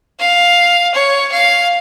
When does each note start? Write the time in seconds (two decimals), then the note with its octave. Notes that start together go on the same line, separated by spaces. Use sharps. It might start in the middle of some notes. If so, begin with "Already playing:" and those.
0.19 F5
0.94 C#5
1.32 F5